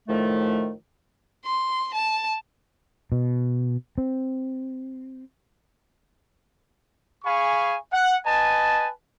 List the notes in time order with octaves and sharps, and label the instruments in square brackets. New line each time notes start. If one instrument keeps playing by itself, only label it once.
[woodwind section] A2 D#3 F3 A3
[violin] C6
A5
[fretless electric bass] B2
C4
[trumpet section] G#4 F5 G#5 B5 C#6
F#5
B4 D#5 G#5 A5